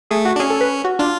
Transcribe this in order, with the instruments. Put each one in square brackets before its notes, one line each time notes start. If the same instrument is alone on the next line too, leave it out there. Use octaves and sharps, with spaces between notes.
[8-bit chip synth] A3 [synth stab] G#4
[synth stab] F#4
[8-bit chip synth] D4
[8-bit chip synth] C#4 [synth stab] G#4
[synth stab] A4
B4
F#4
[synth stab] D4 [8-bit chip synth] F4